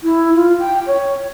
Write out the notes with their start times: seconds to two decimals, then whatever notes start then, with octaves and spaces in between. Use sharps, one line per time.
0.03 E4
0.35 F4
0.59 G5
0.87 C#5